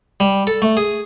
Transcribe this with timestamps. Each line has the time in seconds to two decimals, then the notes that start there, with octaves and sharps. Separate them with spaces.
0.20 G3
0.47 A4
0.62 A3
0.77 G#4